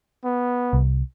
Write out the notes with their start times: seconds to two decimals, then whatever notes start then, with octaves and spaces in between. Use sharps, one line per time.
0.25 B3
0.73 C2